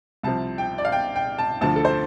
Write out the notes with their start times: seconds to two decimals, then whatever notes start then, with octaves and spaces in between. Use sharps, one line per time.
0.23 C2 C3 F3 A5
0.58 G5
0.78 D5
0.85 F5
0.92 G5
1.16 G5
1.39 A5
1.61 D2 D3 F3 A5
1.76 A4
1.85 C5